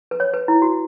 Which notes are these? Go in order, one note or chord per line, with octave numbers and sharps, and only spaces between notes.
B4
C#5
B4
E4
F#4